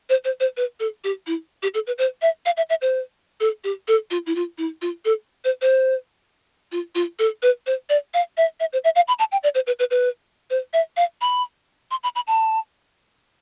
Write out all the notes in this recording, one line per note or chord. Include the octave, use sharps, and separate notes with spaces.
C5
C5
C5
B4
A4
G4
E4
G4
A4
B4
C5
E5
F5
E5
E5
C5
A4
G4
A4
F4
E4
F4
E4
F4
A4
C5
C5
F4
F4
A4
B4
C5
D5
F5
E5
E5
C5
E5
F5
B5
A5
G5
D5
C5
B4
B4
B4
C5
E5
F5
B5
C6
B5
B5
A5